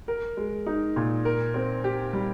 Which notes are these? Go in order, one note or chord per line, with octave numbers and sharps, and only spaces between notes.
A#4
G#3
D#4
A#2
A#4
C4
G4
G3